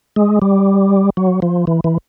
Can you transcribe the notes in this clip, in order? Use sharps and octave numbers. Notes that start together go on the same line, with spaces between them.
G#3
G3
F#3
F3
E3
E3